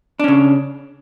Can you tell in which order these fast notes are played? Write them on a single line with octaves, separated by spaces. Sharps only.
D4 C#4 C#3